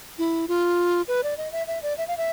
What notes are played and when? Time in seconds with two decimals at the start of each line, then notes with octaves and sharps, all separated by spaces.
0.19 E4
0.48 F4
1.08 B4
1.23 D5
1.37 D#5
1.52 E5
1.67 E5
1.83 D5
1.98 E5
2.08 F5
2.17 E5